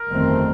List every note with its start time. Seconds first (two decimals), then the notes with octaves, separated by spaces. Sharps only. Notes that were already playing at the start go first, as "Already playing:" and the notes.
Already playing: A#4
0.10 G1 F2 D#3 A3 C4